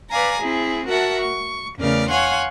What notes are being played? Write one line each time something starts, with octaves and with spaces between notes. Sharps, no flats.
B4 D5 F5 G#5 A#5
C4 E4 G#4
F#4 A#4 E5 F#5 A5
C#6
E2 C#3 A3 A#4 D5 F6
C#5 F5 F#5 G#5 C6